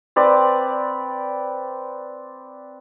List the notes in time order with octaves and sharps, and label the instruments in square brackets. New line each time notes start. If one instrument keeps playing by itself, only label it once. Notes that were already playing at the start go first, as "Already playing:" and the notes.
[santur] C4 B4 D5